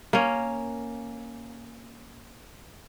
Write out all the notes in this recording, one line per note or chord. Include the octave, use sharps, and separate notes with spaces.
A#3 C#4